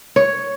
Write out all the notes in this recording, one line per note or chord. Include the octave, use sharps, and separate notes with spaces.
C#5